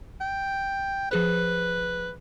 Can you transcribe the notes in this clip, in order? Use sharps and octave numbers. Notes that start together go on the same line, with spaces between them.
G5
F3 G#4 B4 C5